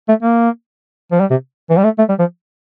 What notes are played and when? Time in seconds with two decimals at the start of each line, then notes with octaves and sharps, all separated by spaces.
0.09 A3
0.23 A#3
1.12 F3
1.21 G3
1.31 C3
1.70 E3
1.78 G3
1.84 A3
1.99 A3
2.09 G3
2.19 F3